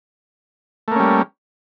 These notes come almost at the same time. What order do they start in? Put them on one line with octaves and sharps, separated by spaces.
A3 A#3 C#4 G3